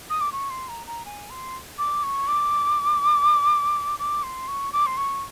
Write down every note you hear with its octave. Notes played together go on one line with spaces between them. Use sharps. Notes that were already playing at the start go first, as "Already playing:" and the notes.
D#6
D6
C#6
C6
A#5
A#5
G#5
C6
D6
C#6
D6
D6
C6
C#6
D6
C6
C#6